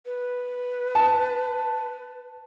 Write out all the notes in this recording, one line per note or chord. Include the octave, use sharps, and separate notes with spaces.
B4
A5